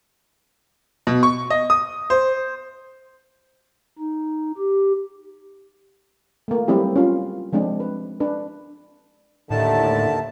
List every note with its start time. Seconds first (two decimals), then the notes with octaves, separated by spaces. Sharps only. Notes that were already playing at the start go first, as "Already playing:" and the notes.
1.07 B2
1.23 C#6
1.50 D#5
1.70 D#6
2.10 C5
3.99 D#4
4.58 G4
6.48 A3 A#3
6.68 F#3 G3 C4 E4 G4
6.96 C#4 F4
7.53 F3 G#3 C4 D4
7.80 B4
8.20 D4 B4
9.50 D#2 A2 D3 D#3 E5 A5